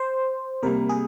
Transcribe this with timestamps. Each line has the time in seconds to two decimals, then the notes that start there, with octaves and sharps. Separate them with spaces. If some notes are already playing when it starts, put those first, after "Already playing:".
Already playing: C5
0.62 C3 G3 A#3 A#4
0.89 G#4